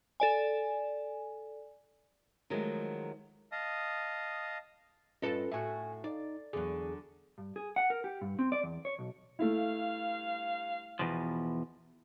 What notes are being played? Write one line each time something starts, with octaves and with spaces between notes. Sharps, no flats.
A4 D5 G#5
D#3 F3 F#3 G#3 A3
D#5 F5 A5 D#6
G2 C#4 F4 A4 B4 D#5
A2 F#4 E5 G#5
D#4 D5
E2 D3 F#3 G#4
G2
G#4
F#5
A#4
G4
G2
C4
D5
E2
C#5
B1
G2 A3 E4 F5
E2 B2 F3